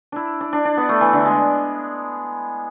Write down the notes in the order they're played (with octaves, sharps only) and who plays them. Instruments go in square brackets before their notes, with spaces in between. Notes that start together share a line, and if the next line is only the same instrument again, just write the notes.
[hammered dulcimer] D4 E4
D4
D4
D4
B3
A3
E3
D3
G#3